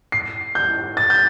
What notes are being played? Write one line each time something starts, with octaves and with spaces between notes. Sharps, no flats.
C7
G6
A6
G6